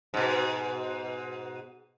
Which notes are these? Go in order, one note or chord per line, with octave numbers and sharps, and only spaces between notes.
G#2 B2